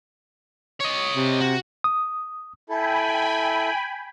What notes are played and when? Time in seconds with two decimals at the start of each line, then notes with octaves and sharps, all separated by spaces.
0.81 C#5 D#5
1.15 C3
1.40 F#4
1.84 D#6
2.69 E4 A4 G5 G#5 B5